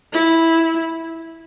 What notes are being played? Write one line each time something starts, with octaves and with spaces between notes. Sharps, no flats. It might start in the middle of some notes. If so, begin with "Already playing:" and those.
E4